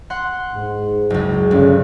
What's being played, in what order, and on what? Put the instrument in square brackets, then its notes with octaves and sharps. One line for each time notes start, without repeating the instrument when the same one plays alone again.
[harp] F#5 C6
[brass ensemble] G#2
[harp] F#1 C#2
[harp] G1 [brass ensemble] C#3